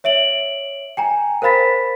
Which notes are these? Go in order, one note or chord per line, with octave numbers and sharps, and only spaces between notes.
C#5 E5 D7 F#7
G5 G#5 A#5
A#4 C5 F5 B5 A6 B6